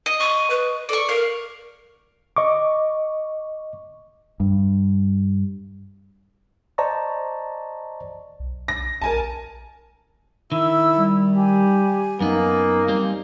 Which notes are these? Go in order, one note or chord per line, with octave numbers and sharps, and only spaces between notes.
D#5
C#6
B4
A4 D5 C#6
A#4 F5
D#5 C#6 D6
G2
C5 D5 D#5 A5 A#5 C#6
B1
A#6
A#1 A#4 G#5 A5
D#3 E4 E6
G3
G4 G#5
F#2 A#3 B3 D#4
G3 C4